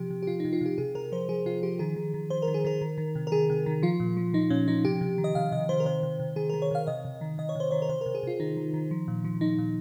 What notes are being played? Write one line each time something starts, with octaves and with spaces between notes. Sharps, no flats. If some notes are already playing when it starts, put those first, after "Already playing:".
Already playing: C3 F3 G4
C3
G4
C3 F4
C3 D#4
F4
C3 G4
C3 G#4
C3 A#4
F3 C5
F3 G#4
C3 F4
F3 G4
D#3 G#4
D#3
D#3
D#3 C5
A#4
D#3
G#4
D#3 A#4
D#3
D#3
C3
A#4
D#3 G#4
C3
D#3
F3 F4
A#2
F3
F3 D#4
A#2 C#4
F3 D#4
C3 G4
C3
D#3
D#5
C3 F5
C3 D#5
D#3 C5
A#4
C3 C5
C3
C3
D#3 G#4
D#3 A#4
C#5
C3 F5
C3 D#5
C3
D#3
C3 D#5
C#5
C3 C5
D#3 C#5
A#4
C3 C5
C3 A#4
G#4
C3 F4
D#3 D#4
D#3
D#3
F3
A#2
F3
F3 D#4
A#2